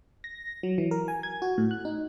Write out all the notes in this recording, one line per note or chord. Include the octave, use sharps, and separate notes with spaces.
A#6
F#3
E3
A#4
G#5
G#6
F#4
A2
F#6
D#4